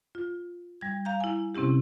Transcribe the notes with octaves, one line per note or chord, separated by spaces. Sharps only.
F4
G3 G#6
F5 A#5 G6
E4 G#5
C3 C4 C#4 E4 G4